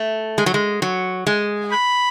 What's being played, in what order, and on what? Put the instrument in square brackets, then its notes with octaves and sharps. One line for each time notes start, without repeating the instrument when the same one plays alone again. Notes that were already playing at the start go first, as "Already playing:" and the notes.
Already playing: [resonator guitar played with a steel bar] A3
G#3
F#3
G#3
F#3
G#3
[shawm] B5